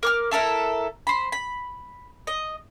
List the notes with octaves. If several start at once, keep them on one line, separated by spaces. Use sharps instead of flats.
A#4 D6 F6
E4 A4 A#4 E5
C5 B5
B5
D#5